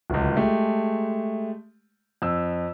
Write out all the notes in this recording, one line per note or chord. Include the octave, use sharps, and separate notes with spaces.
D1 C#2
G#3 A3 G4
F2 E6